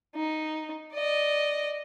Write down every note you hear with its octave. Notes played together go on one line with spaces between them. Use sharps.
D#4
D5 D#5